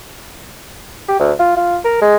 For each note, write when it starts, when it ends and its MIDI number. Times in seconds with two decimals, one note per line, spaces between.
1.08 1.19 67
1.20 1.32 38
1.39 1.53 65
1.57 1.78 65
1.85 1.99 70
2.02 2.16 56